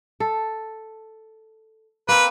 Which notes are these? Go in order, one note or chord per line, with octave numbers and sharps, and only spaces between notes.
A4
A#3 C4 B4